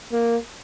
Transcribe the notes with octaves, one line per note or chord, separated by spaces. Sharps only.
A#3